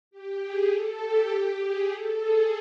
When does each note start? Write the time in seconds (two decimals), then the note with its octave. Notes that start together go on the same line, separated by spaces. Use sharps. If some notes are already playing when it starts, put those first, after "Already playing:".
0.11 G4
0.41 G#4
0.71 A4
1.00 G4
1.60 G#4
1.90 A4
2.19 G#4